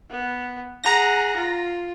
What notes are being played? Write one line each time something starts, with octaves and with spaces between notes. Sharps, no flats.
B3
G#4 F#5 A#5 A#6
F4